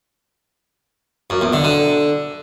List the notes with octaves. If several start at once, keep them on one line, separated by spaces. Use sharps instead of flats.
F#2
E2
D3
D3